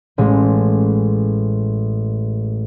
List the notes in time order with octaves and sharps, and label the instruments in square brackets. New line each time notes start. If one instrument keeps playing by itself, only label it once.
[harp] A1 G#3